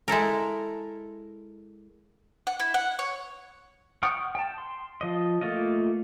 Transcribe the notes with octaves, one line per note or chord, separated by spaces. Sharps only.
G#3 E4 A4 A#4
F#5
E4
F#5
C#5
F#5 G5 C#6 D#6 F6
G5 A5
C6
F3 D#5
A3 A#3 F4 D#5